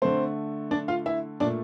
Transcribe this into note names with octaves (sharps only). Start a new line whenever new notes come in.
D3 A3 C4 C5
D4 D5
F4 F5
E4 E5
A#2 A3 D4 D5